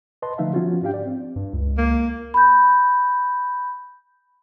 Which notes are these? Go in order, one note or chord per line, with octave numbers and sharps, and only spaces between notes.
B4 D#5 A5 C6
D3 F3 A3 D#4 E5 F5
F3 B3 C#4 F4 F#4
G#2 D4 G4 F5 G5
D5
C4
G2
C#2
A#3
B5 G6